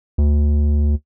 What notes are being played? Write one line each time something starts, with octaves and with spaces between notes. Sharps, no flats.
D2